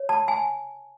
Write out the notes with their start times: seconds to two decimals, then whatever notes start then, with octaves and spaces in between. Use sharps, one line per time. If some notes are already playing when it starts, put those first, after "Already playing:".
Already playing: C#5
0.09 A5
0.28 G#5